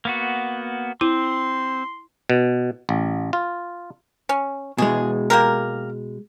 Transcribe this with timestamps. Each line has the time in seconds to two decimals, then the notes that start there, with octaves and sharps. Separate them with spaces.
0.05 A#3 B3 F#4
1.01 C4 E4 C6
2.30 B2
2.89 A1
3.33 F4
4.29 C#4
4.78 B2 G#3 G#4
5.30 A#3 G4 A#4